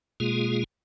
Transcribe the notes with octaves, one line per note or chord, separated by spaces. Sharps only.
B2 G#3 A#3 F4 G#4